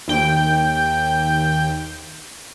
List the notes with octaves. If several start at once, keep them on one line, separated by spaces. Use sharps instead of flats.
D#2 G5